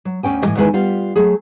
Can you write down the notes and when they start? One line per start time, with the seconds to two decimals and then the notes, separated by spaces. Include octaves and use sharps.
0.05 F#3
0.23 D2 G#2 C#4 G5 G#5
0.42 A2 E3 A3 D#5
0.57 E2 D#3 G#3 E4 B4 G#5
0.73 G3 B3 F4
1.16 F#3 A3 G#4